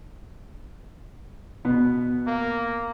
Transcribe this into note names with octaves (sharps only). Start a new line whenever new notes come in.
B2 B3
A#3